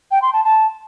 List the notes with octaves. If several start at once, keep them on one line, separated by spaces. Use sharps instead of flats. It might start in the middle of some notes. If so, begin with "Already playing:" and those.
G5
C6
A5
A5